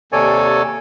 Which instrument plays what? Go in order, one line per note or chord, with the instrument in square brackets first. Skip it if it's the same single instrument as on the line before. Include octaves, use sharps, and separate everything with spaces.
[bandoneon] D#2 C3 A4 C#5 D5 G#5